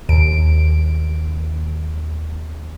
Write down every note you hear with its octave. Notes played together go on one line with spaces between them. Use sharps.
D#2 D7